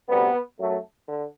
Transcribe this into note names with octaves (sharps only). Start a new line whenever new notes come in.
D2 C3 G3 B3
F#2 F#3 A3
D3